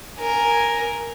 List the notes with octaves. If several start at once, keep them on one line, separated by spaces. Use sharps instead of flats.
A#4 G#5